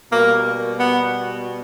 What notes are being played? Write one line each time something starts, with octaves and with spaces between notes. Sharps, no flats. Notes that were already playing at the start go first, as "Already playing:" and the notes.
B2 G3 A#3
B3